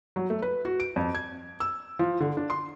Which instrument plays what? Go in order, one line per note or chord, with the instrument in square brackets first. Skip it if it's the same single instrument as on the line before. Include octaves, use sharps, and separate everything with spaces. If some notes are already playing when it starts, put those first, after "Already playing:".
[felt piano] F#3
A3
B4
F#4
D7
F2
G#6
E6
F3
D3
D4
C6